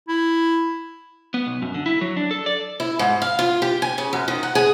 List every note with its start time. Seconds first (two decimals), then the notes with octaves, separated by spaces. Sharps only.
0.08 E4
1.34 B3
1.46 B1
1.62 F#2
1.74 D3
1.86 E4
2.01 F#3
2.17 D4
2.31 A4
2.46 D5
2.80 E4
2.99 G#2
3.22 F5
3.39 F4
3.62 G4
3.82 G#5
3.98 C#3
4.13 F#2
4.28 D#3
4.43 F#5
4.55 G#4